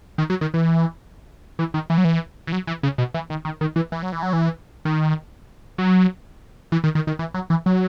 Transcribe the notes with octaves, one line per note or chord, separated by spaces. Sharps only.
D#3
F#3
D#3
E3
E3
D#3
E3
F#3
E3
E3
F#3
E3
C#3
B2
E3
D#3
D#3
D#3
E3
E3
F#3
E3
F#3
E3
D#3
F#3
E3
D#3
D#3
D#3
E3
F#3
E3
F#3